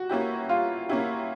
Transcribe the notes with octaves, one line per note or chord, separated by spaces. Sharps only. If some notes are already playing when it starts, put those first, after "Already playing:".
Already playing: G3 F#4
A#3 C#4 E4 G4
G3 F4
A#3 C#4 E4 G4